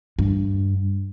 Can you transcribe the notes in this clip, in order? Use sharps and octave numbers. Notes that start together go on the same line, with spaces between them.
G2